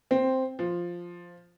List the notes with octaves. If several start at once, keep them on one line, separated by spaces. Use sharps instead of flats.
C4
F3